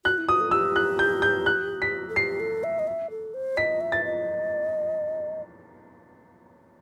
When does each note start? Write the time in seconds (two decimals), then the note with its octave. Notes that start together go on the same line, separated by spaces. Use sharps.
0.05 F#4 F#6
0.18 E4
0.29 F#4 D#6
0.40 A4
0.51 G4 E6
0.76 F#6
0.99 G6
1.22 G6
1.46 F#6
1.82 B6
2.09 A4
2.16 G4 C7
2.40 A4
2.64 E5
2.79 D#5
2.87 E5
3.10 A4
3.34 C5
3.57 D#5 B6
3.81 E5
3.92 A6
4.04 D#5